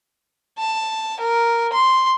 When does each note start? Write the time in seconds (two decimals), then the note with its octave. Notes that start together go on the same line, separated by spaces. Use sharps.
0.59 A5
1.20 A#4
1.73 C6